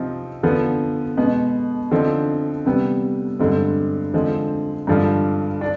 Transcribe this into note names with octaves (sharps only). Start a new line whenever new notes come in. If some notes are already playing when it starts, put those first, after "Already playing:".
Already playing: C3 F3 C4 D#4
D3 F3 B3
B2 G#3 B3
D3 F3 C4 D#4
C3 G3 B3
G2 D3 G#3 C4
D3 F3 G#3 C4
G2 D3 F3 G#3
D4